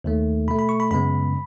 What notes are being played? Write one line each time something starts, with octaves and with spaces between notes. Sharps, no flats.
D#2 D#3 A3
B2 A3 B5
B5
C#6
B5
F#2 C#3 G#3 B3 B5